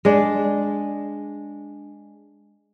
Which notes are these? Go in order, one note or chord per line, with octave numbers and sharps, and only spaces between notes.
G#3 D4